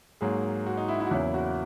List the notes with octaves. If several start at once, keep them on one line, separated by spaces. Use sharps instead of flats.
G#2 F#3 A#3 G#4
F#4
D#4
E4
E4
F#4
E2 C#3 F#3 A#3 E4
F#4